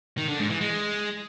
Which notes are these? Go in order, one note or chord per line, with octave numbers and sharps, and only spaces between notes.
D#3
D3
G#2
E3
G#3